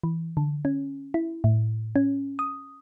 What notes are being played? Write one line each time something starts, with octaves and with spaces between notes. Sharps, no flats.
E3
D3
C#4
E4
A2
C#4
D#6